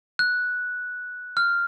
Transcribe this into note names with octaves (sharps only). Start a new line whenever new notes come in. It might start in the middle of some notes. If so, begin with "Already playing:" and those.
F#6
F6